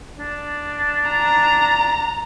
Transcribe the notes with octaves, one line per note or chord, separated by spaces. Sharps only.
D4
A#5